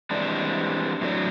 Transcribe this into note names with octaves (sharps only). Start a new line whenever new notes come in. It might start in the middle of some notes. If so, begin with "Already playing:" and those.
E3 G3 G#3 C4 D4
A2 F#3 A3 D4